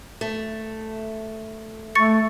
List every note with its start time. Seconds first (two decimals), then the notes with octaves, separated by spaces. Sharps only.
0.21 A3
1.95 A3 C#6 A6 C#7